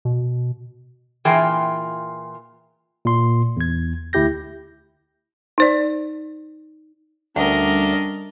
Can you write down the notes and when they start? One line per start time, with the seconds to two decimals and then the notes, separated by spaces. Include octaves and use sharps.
0.05 B2
1.25 A#2 E3 F4 G#4 G5
3.05 A#2 C6
3.57 E2 G#6
4.13 D2 E4 G4 G6 A#6
5.58 D#4 C5 D5
7.36 D2 G3 C#4 D4 A#4 D#5 D6